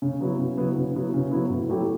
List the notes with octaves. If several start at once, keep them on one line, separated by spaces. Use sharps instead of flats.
C#3
F#3 B3 E4
C#3
F#3 B3 E4
C#3
F#3 B3 E4
C#3
F#3 B3 E4
A2
F#3 A3 E4 G4